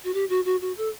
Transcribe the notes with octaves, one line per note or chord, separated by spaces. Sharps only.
F#4
G4
F#4
F#4
F#4
A4